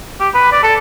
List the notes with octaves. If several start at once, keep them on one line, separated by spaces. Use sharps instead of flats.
G4
B4
D5
A4